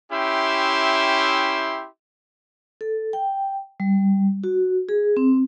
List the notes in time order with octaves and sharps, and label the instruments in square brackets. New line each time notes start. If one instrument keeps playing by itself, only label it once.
[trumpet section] C#4 E4 G4 E5 G5 C6
[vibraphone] A4
G5
G3
F#4
G#4
C4